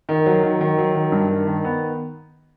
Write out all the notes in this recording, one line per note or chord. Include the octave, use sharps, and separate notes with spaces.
D#3
F#3
D#3
D#3
F#3
D#3
G2
D#3
D#3
B3